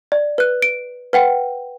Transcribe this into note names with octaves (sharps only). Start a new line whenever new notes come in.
D5
B4 F#6
D7
B4 F#5 G5